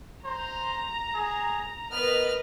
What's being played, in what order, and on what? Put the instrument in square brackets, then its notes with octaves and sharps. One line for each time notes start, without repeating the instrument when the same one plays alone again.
[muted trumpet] C5 [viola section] A#5
[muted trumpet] G#4
[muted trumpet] B3 [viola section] A#4 D#5 [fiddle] B4 F6